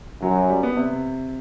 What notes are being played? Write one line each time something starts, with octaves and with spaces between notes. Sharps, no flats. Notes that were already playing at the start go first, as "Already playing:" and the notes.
F#2 F#3
G3
B3
C3